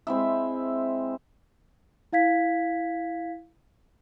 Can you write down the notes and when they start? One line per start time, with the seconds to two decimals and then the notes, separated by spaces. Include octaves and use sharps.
0.07 G#3 C4 E4 E5
2.13 E4 F5 G#6 B6